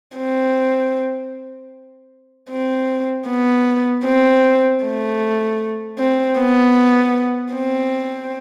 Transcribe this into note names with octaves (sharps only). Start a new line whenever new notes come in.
C4
C4
B3
C4
A3
C4
B3
C4